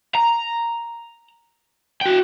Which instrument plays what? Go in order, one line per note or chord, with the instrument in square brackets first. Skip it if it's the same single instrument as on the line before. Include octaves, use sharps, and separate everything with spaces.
[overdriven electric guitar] A#5
F#4 G5